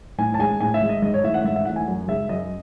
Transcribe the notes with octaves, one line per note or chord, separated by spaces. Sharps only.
A2 G#5
A5
G#3 G#5
A2 G#5
E5
G#3
D#5
G#2 D#5
C#5
E3 A3 E5
F#5
G#2 E5
E5
E3 A3 F#5
G#5
F#2
C#3 G#3 E5
F#2 D#5